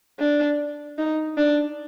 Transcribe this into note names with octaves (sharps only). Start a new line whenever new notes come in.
D4
D#4
D4